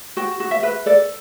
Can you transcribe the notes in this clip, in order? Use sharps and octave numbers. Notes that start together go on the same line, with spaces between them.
F#4 G5
F#4
E5
B4
A4 D5